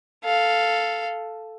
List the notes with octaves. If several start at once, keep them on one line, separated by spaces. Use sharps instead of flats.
A4 F5